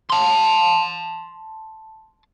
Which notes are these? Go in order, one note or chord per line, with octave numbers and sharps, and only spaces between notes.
A5 C6